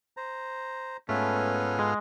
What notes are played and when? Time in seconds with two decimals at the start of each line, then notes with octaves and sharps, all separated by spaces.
0.17 C5 A#5
1.09 G#2 A3 B3 C#4 F4 A4 B4
1.79 G#3 G#4